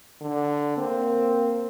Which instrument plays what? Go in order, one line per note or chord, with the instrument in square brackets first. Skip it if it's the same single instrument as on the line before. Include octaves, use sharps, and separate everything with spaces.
[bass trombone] D3
[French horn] A#3 [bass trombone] C4